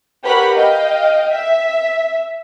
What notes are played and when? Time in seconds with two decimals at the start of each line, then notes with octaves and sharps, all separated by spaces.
0.25 G4 A#4 B4 C#5 F#5 B5
0.56 D#5 F5 G5
1.34 E5